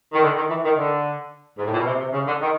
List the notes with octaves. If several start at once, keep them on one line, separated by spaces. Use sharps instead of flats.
D#3
D3
D#3
E3
D#3
D3
G#2
A2
A#2
B2
C3
C3
C#3
D3
D#3